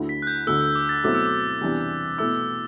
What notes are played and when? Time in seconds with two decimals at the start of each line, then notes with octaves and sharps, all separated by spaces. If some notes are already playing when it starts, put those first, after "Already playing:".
Already playing: D2 D3 A3 E4
0.09 B6
0.22 F#6
0.27 G6
0.47 D2 D3 A3 E6
0.61 E6
0.75 D6
0.89 A6
1.04 B2 F#3 A3 C4 E4 D6
1.15 E6
1.26 D6
1.61 E2 C3 E3 G3 D4
2.18 B2 A3 E4 E6